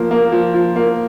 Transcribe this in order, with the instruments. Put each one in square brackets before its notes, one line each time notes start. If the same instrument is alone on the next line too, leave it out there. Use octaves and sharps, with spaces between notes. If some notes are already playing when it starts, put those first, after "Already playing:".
Already playing: [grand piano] F3 A#3
A#3
F3
F3
A#3